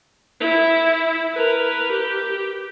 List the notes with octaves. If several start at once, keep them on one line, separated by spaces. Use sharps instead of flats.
E4
A#4 B4
G4